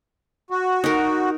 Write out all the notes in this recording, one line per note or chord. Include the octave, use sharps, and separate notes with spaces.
F#4
D#4 A#4